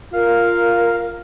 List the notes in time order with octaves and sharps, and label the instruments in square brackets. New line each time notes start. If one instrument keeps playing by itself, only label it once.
[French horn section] F4 [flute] A#4 [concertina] F5